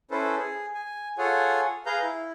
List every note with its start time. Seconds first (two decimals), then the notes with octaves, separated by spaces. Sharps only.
0.11 C#4 E4 A4 B4 C5
0.37 G#4
0.75 G#5
1.18 F4 G#4 A4 C#5 F#5 G#5
1.86 G#4 B4 F5 A#5 G6
2.02 E4